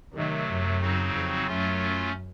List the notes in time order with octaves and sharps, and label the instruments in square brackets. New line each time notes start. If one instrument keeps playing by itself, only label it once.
[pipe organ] C3 F#3 A3 [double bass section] D#3
[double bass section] F#2
[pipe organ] C#3 F#3 C4 D#4 F#4
[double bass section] F2
[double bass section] F#2 [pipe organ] F#3 A3 C#4 F4